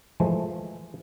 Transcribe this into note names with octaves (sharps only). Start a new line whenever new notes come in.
E3 F3 G#3 A3